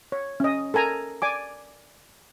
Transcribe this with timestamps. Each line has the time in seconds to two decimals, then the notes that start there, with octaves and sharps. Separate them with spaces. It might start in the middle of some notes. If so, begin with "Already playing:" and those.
0.12 C#5
0.40 C#4 D#5
0.74 A4 A#4 G#5 A#5
1.22 D5 G#5 D6